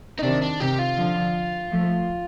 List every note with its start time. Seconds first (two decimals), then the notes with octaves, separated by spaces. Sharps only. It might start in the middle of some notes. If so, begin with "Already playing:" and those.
0.19 D#4
0.23 C3 D#3 D4
0.42 D4
0.60 C3 D#3 G4
0.79 F4
0.97 D3 F3
1.71 F3 A3